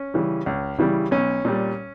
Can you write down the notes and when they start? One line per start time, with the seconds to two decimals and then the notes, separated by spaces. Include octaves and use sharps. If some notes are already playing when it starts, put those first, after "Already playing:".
Already playing: C#4
0.14 C#3 E3 G3
0.46 C#2
0.78 C#3 E3 G3
1.11 B1 C#4
1.45 A#2 G3